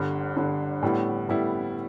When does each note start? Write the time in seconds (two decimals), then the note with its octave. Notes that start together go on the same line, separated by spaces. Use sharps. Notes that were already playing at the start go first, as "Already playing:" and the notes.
Already playing: G1 G2 D3
0.36 G1 G2 D3
0.83 A2 G3 B3 E4
1.29 A2 G3 B3 E4